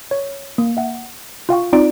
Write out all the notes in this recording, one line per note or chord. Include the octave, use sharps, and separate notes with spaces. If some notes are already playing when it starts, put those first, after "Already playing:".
C#5
A#3
E5 F#5
F4 F5 G5 C#6
C4 D#4 F4 D5 D7